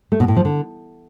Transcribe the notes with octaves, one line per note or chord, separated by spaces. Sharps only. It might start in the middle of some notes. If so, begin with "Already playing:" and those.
A3
B2
A2
F3
D3